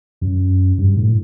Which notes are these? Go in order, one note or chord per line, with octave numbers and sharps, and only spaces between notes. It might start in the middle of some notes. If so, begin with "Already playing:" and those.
F#2
G2
A2